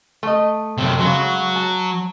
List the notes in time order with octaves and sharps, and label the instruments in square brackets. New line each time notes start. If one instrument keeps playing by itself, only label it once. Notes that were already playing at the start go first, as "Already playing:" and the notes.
[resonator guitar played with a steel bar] A3 D#5
[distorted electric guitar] F#2 C3
[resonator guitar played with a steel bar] C#3 G#3 [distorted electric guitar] F#3
[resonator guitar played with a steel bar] A5